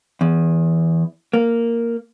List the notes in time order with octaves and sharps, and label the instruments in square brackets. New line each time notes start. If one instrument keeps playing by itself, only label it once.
[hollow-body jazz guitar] E2
A#3